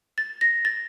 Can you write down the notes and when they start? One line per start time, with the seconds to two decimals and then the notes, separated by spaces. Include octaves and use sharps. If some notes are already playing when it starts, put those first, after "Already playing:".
0.18 A6
0.41 A#6
0.65 A6